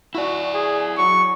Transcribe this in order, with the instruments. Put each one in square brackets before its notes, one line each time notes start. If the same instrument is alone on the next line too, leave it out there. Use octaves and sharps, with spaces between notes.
[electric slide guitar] E4 D5 [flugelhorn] F#4
[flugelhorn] G#4
[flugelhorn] F#3 [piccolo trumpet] C#6